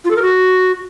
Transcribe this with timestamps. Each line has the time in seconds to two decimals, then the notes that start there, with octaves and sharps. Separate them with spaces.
0.05 F4
0.10 A4
0.16 A#4
0.22 F#4